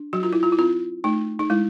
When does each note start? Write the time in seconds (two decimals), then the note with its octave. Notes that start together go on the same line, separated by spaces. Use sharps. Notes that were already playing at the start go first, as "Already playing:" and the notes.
Already playing: D4
0.13 F#3 F#4
0.23 F4
0.33 E4
0.43 F4
0.52 E4
0.59 C4 F4
1.04 A3 D#4
1.39 D#4
1.50 G#3 E4